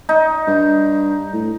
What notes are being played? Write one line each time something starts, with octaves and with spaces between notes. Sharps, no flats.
D#4
G2
A2